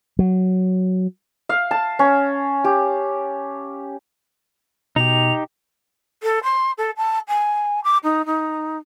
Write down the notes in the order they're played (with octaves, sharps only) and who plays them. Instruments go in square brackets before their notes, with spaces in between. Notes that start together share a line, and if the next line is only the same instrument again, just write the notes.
[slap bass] F#3
[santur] F5
A5
C#4
G4
[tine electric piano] B2 [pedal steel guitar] D#4 G4 [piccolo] F7
[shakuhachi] A4
C6
A4
A5
G#5
D6
D#4
D#4